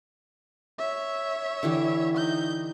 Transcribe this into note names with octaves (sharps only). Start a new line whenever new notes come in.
C#5 E5
D3 E3 G4
D#4 G6